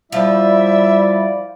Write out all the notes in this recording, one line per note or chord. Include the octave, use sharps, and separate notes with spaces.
F3 G3 E4 D5 E5